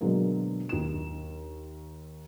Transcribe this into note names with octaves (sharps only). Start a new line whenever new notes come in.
B2 D3 F#3 G#3 A#3
D#2 E7